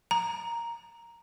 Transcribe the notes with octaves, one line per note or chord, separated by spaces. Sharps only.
A#5